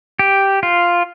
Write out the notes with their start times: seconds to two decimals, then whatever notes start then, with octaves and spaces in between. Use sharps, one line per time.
0.19 G4
0.63 F4